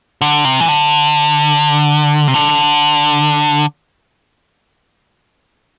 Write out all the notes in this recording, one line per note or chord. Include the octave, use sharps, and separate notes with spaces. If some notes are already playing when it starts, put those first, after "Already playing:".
D3
C3
E3
D3
C3
D3